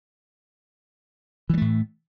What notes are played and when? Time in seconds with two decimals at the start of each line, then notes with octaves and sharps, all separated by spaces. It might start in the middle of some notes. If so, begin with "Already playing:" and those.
1.50 E3
1.54 G3
1.58 A3
1.61 A2